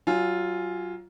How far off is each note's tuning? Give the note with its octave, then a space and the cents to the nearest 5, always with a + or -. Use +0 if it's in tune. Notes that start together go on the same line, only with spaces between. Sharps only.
F#3 +25 F4 +0 G#5 +0